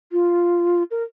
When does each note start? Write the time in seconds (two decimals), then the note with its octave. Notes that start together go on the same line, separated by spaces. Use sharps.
0.12 F4
0.91 A#4